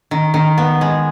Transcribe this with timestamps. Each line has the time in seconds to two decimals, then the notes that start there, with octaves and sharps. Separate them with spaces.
0.11 D#3
0.34 D#3
0.58 B3
0.81 G#3